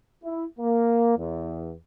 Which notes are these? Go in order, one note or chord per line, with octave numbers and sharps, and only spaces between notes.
E4
A#3
E2